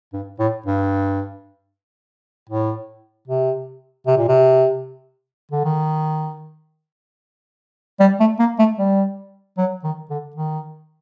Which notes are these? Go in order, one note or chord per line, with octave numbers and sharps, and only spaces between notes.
G2
A2
G2
A2
C3
C3
A#2
C3
D3
D#3
G3
A3
A#3
A3
G3
F#3
D#3
D3
D#3